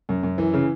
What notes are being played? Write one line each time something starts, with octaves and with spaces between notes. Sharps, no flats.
F#2
F#2
E3
C#3